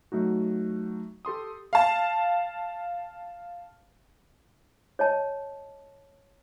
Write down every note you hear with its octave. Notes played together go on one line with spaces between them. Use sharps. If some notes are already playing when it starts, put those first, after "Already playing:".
F#3 A3 D#4 F#4
G4 A4 C6 D#6
F5 A5
C#5 D#5 A5